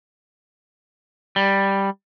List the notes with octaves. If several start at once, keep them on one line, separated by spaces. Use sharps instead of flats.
G3